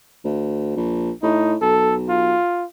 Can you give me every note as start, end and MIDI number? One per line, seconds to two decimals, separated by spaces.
0.25 0.75 38
0.76 1.11 34
1.23 1.56 45
1.23 1.56 63
1.61 2.35 35
1.61 1.95 69
2.09 2.66 65